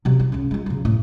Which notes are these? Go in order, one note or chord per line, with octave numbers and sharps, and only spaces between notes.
C3 F#3
E4
C#2 C#4
G#3 F4
C#3 F#3
A2